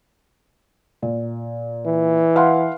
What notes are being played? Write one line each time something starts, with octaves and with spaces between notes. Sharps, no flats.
A#2
E3
F5 F#5 C6